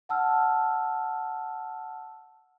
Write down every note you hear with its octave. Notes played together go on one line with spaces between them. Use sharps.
F#5 A5 E6 F6